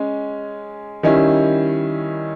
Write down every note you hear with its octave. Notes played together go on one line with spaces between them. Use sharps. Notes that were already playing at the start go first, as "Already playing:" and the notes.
Already playing: G#3 C#4
D#3 G3 C#4 E4